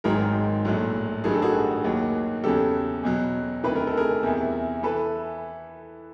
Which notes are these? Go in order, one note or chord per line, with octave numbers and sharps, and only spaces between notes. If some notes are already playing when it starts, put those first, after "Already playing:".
G#1 G#2 D#3 F#3 G#4 A#4
A#1 A2 F#3
A1 G2 D#3 F#3 G#4
A4
F#4 G#4
D#2 D#3 F#3
E2 C#3 F#3 G4 A4
E2 B2 F#3
D2 C3 D#3 B4
A#4
A4
G#4 A#4
E2 C3 E3
E3 A4 B4